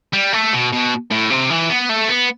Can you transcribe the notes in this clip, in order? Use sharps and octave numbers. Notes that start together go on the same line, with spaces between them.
G3
A3
B2
B2
A2
C3
E3
B3
A3
B3